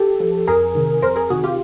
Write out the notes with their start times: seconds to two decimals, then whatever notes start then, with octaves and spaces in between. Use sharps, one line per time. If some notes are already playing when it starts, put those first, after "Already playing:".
Already playing: G4 A4
0.20 F3
0.47 F2 G#4 A#4
0.75 C3 D#3
1.02 F2 A#4 C5
1.16 G#4 A#4
1.30 C3 D#3 F#4 G#4
1.44 F4 G4